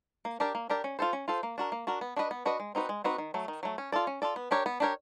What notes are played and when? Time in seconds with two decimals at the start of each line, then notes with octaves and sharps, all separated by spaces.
0.25 A#3
0.40 D4 G4 A#4 D5
0.55 A#3
0.69 D4 G4 A#4 D5
0.84 C#4
0.99 F4 A4 C5
1.13 C#4
1.28 F4 A4 C5
1.43 A#3
1.58 D4 F#4 A#4
1.72 A#3
1.87 D4 F#4 A#4
2.01 B3
2.16 D4 F#4 B4 D#5
2.31 B3
2.46 D4 F#4 B4 D#5
2.60 G#3
2.75 C4 D#4 F#4 B4
2.89 G#3
3.04 C4 D#4 F#4 B4
3.18 D#3
3.34 F#3 A3
3.48 D#3
3.63 F#3 A3
3.78 C#4
3.92 F4 A4 D5
4.07 C#4
4.22 F4 A4 D5
4.36 B3
4.51 D4 G4 A#4 C#5
4.66 B3
4.80 D4 G4 A#4 C#5